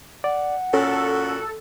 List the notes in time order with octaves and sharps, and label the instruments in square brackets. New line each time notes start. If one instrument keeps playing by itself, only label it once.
[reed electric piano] D5 [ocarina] F#5
[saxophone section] A#2 F#4 [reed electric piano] C#4 [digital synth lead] A4